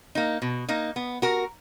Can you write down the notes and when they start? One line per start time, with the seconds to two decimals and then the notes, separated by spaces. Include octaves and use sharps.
0.15 A#3 D#4
0.42 B2
0.69 A#3 D#4
0.96 B3
1.22 F#4 A#4